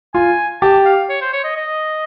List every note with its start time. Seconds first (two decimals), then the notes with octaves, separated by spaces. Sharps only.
0.14 F4 G#5
0.62 G4 A5
0.85 F5
1.09 C#5
1.21 C5
1.33 C#5
1.44 D#5
1.56 D#5